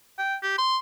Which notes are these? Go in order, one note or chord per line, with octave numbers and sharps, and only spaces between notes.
G5
G4
C6